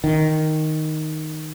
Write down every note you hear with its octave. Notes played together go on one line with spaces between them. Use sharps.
D#3